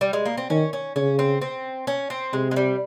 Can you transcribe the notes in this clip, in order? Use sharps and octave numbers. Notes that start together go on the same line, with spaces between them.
G3
G#3
A#3
C4
D#3 C#4
C#4
C#3 C#4
C4
C4
C#4
C4
C3 G#3
G#3
G3